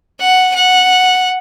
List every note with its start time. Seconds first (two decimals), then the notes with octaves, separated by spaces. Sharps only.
0.19 F#5
0.55 F#5